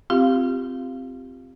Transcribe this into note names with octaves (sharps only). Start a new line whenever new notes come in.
C4 F4 G4 F5